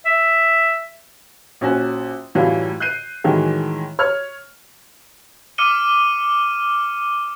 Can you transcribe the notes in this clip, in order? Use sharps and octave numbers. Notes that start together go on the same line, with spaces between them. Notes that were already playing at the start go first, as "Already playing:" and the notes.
E5
A#1 C#4 F#4
F#2 A2 E3 F#3 G3 F4
F#6 G6 C7 D#7
A2 D#3 E3 F#3 G#3
C#5 F6
D6 D#6 F6 C#7 D#7 G7